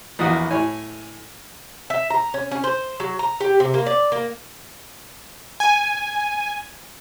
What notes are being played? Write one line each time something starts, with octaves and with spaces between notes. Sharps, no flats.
A#1 E2 F#4 D#6
A2 C#5 G#5
E5
A#5
C#4
C#4
C5
F#3
A#5
G4
C3
A#3
D5
A#3
G#5